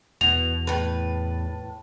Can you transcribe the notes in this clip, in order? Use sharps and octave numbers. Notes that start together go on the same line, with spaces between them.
E2 B2 F7
A2 B4 A5